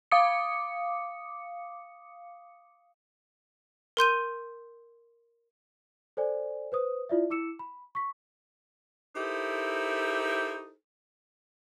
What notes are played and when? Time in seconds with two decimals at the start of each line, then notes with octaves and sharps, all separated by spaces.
0.11 F5 D6 D#6 C#7
3.97 A#4 C6 G6 D#7
6.17 A4 C5 D5 G#5
6.72 B4 C5 D#6
7.09 E4 F4 D5 E5
7.30 E4 D6 E6 C#7 E7
7.59 B5
7.95 C#6 B6
9.16 D#4 E4 G4 A4 A#4 C5